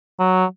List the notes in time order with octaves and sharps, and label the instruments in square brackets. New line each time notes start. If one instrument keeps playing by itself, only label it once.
[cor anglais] F#3